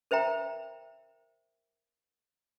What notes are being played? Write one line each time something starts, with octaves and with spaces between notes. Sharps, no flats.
A#4 C5 E5 G5 A#5